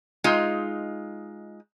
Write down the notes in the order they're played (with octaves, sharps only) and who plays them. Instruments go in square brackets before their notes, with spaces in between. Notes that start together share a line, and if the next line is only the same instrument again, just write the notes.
[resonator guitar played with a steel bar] G#3 D#4 F4